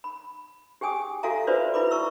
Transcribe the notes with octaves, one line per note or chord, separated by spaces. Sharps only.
B5
G4 G#4 G5 G#5 D#6
F#4 A4 E5 F5 G#5 A#5
F4 F#4 B4 C5 D5 E5
E4 B4 B5 D6
A#5 C#6 E6